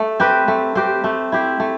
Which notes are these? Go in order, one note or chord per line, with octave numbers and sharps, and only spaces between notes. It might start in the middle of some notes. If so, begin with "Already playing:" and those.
Already playing: A3
C4 G4 B4
A3
C4 G4 B4
A3
E4 G4 C5
A3